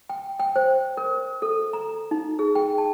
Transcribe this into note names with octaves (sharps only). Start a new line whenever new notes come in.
G5
G5
C5
A#4
A4
A#5
D#4
G#4
G5
A5